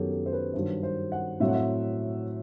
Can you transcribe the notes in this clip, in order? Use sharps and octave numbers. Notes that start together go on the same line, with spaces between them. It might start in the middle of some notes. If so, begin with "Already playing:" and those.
Already playing: F#2 D#3 F#3 B3 G4 A4
A4
C5
B4
G2 D#3 F#3 C5
C5
F#5
A2 F#3 C4 E5
F#5
E5